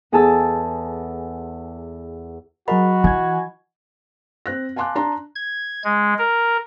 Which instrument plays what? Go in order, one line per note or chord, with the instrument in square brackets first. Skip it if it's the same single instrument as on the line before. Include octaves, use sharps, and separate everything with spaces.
[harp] E2 G#4 A4 A5 E6
[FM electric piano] F#3 G#4 A#4 [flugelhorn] F#4 [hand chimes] D#5 F#5 B5
[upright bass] E3 [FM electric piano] G#5 G#6
[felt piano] C4 F#6 A#6
F5 G#5 A5 C6 D6 F#6
D4 A5 A#5 C6
[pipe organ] G#6
G#3
A#4